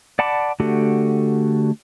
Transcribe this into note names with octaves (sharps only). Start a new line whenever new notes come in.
D5 F#5 A5 B5 D6
D3 A3 F#4 G4